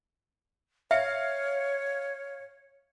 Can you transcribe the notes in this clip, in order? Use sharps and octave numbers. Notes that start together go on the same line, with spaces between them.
C#5 E5 F5 C#7